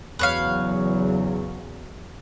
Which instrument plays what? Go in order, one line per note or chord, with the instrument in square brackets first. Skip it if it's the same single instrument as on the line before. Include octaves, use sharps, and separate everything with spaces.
[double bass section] E2 C#3 F#3 [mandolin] B4 C#5 F5